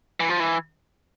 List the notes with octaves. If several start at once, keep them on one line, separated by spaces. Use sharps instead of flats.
E3
F3
E3